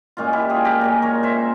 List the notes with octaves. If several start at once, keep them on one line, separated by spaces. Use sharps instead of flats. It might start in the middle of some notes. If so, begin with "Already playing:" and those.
A#2 G#3 C#4 F4
E4 G4
F4 G#4
G4 A#4
A#2 G#3 C#4
A#4 C#5
C5 E5